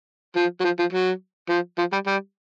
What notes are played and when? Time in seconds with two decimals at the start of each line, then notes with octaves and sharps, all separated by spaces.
0.36 F3
0.60 F#3
0.64 F3
0.79 F3
0.93 F#3
1.49 F3
1.78 F3
1.92 G3
2.07 G3